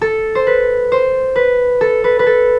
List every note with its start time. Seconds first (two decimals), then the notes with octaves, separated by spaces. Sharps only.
0.01 A4
0.35 C5
0.47 B4
0.92 C5
1.36 B4
1.81 A4
2.04 B4
2.19 B4
2.26 A4